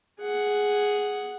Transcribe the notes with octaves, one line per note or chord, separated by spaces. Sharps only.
G#4 F#5